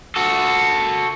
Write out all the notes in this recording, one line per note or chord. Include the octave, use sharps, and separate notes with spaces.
F#4 A4